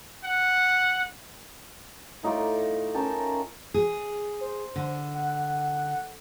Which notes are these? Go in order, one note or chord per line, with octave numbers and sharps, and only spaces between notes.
F#5
A2 D#4 F4 D6
C#4 A#4 G5 A5
G#4
C5
D3
F#5